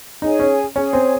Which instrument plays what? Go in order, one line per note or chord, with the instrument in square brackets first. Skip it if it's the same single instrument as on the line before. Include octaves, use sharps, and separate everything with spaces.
[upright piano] D#4 [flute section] G#4 C#5 G#5
[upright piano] C#4
[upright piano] C#4 [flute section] G#4 C#5 G#5
[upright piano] C4